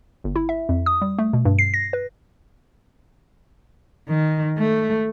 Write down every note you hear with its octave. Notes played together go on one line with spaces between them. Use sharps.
G1
E4
E5
F2
D#6
G3
A3
B2
G2
C7
A#6
B4
D#3
A3